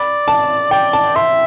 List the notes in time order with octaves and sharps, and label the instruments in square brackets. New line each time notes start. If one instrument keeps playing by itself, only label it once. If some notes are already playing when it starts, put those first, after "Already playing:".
Already playing: [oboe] D5 [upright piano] B5
[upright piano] A5
[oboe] D5 [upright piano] G5
[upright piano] A5
[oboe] E5 [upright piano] C6